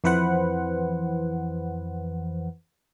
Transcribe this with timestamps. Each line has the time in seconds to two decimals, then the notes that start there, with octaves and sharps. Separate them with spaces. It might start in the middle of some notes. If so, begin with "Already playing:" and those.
0.04 F2 E3 B4 C5 F#5